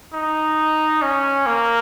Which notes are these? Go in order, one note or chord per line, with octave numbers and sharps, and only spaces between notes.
D#4
C#4
A#3